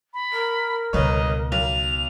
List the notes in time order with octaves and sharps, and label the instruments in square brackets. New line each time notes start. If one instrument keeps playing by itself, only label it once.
[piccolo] B5
[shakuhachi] A#4
[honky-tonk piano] G1 B4 C#5 [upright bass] C#2 B2 [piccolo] D#5
[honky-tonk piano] B1 [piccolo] F7